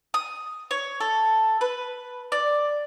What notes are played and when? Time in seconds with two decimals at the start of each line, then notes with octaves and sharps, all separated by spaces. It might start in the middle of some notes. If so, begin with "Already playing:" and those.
0.14 D#6
0.71 C#5
1.00 A4
1.61 B4
2.32 D5